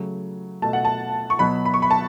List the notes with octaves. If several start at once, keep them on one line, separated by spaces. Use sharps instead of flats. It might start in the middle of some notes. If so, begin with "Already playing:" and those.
Already playing: C#3 F#3 A3
B2 A3 A5
F#5
A5
C#6
B2 F#3 B3 B5
B5
C#6
B5
A5